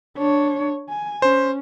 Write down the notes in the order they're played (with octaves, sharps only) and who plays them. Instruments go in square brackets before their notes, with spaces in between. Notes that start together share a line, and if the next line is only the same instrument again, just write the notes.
[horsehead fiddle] D4 C#5
G#5
[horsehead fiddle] C#4 [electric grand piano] C5